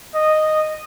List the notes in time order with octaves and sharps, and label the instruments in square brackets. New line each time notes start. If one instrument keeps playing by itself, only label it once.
[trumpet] D#5